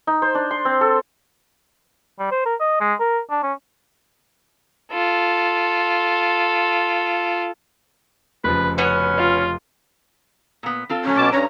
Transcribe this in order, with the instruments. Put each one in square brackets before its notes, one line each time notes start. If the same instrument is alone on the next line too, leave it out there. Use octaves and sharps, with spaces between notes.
[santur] D#4
C5
D4
C6
C4
A4
[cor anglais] G3
C5
A#4
D#5
G#3
A#4
D4
C#4
[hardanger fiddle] F4 A4
[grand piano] F1 C#3 F3 [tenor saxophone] B4
[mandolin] B3 F#4 F#5 [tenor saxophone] C#4
[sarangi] F4
[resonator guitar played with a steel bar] A#2 B3
C4 F4 A4
[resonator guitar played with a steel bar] A#2 F#3 A3 [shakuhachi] C#4
[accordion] B2 A5 D6
[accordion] G2 A#5 [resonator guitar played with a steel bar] C#4 [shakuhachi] C#5